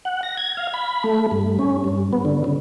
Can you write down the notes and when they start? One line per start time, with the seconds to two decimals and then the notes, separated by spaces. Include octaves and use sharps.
0.05 F#5
0.23 A#6
0.37 G#6
0.57 F5
0.74 B5
1.04 A3
1.31 G2
1.59 C#4
1.84 G2
2.13 B3
2.25 D3
2.44 C#3